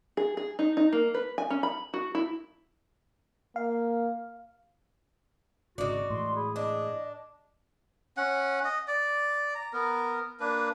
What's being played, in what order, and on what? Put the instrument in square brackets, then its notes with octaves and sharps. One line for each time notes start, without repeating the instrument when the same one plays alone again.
[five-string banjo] G#4
G#4
D#4
D#4
A#3
B4
G#5
C#4
B5
F#4
E4
[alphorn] A#3 [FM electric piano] F5
[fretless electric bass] G#1 C#3 [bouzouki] D#4 D5 [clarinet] F#4
[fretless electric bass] A2 E3 G#3 [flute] C6
[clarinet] G#4 [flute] B5
[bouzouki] D4 [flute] D#5
[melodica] C#4 F#5
D#5
D5
A#5
B3 A#4
A#3 D4 B4